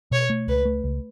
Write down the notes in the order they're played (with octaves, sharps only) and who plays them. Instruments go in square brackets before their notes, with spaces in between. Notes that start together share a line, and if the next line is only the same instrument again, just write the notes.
[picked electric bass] B2 [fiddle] C#5
[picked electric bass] A3
[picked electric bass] C#2 [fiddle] B4
[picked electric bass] A3
C#2